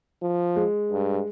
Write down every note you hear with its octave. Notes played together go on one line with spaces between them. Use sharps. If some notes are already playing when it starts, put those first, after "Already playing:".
F3
G#3
G2